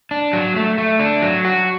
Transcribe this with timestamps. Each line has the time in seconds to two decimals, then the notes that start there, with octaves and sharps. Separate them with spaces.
0.11 D4
0.33 F#3
0.56 A3
0.78 A3
1.00 D4
1.22 F#3
1.45 F#4